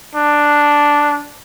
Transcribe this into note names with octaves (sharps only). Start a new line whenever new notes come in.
D4